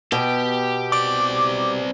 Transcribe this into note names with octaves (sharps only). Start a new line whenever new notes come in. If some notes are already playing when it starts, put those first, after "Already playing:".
B2 G4
C4 D5 D6